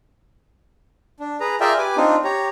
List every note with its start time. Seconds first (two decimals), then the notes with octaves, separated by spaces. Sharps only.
1.20 D4
1.40 G#4 B4 A#5
1.60 F4 G#4 A#4 D5 E5 G5
1.78 G4 B4 G#5 D6
1.97 C4 D4 D#4 F4
2.24 G4 C#5 A#5